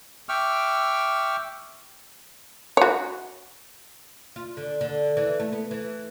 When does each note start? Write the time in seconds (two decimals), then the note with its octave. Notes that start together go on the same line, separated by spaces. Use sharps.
0.29 E5 G5 C#6 D6 E6 F6
2.77 F#4 C#5
4.36 F4
4.57 D3
4.81 D3
5.17 E3
5.40 A3
5.53 B3
5.71 E3